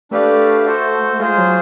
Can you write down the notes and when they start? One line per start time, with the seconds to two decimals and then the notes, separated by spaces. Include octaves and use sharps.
0.11 A3 D4 G4 B4 D5 F5
0.66 F#4 A4 C5
1.19 G#3 F4 G#4 C5
1.38 F#3